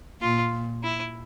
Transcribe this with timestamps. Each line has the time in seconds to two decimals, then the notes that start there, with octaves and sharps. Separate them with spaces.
0.22 A#2 F4
0.83 E4